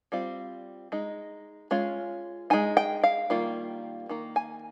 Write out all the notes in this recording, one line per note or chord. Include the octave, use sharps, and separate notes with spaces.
G3 C4 F4
G#3 D#4
G#3 C#4 F4
G#3 D#4 G#5
G5
F5
D#3 G3 A#3 F4
D#3 A#3
G#5